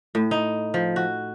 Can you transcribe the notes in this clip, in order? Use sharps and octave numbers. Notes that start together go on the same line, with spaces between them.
A2
D#4
F3
F#4